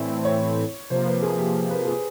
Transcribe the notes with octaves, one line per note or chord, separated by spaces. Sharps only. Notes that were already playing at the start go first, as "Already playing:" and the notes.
Already playing: A2 E3 A3 C4 E4 D5
C#5
C3 F3 A#3 C5
B4
G#4
G4
B4
G#4